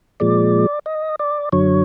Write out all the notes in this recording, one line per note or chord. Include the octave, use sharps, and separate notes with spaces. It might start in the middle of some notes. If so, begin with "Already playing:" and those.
A#2 F3 G#3 D5
D#5
D5
F#2 D3 F#3 C#5